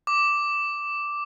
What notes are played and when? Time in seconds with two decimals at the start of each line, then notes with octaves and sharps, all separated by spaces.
0.07 D6